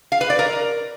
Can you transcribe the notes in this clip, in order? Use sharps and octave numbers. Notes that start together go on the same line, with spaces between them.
F5
B4
D5
A#4